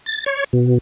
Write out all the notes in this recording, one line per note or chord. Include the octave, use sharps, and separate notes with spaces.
A6
C#5
B2